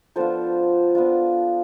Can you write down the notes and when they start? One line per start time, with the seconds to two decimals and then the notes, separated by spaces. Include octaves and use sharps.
0.16 F3 B3 D4 F4 A4 C5
0.95 F3 B3 D4 F4